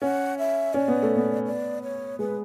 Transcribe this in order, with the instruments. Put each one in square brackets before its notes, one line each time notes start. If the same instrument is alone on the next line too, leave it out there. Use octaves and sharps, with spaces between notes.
[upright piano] C#4 [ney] F#5
[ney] E5
[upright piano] C#4 [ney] D5
[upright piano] B3
A3
B3
[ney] D5
C#5
[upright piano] G#3 [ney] B4